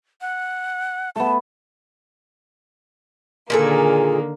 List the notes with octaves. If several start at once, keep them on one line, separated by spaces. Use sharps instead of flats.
F#5
A3 B3 A5
A#2 D3 D#3 A#3 G#4 A4